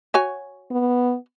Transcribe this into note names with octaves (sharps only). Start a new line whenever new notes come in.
F#4 C#5 G#5
B3